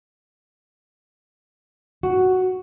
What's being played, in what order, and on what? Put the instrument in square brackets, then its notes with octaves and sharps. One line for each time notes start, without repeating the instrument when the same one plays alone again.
[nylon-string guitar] F#4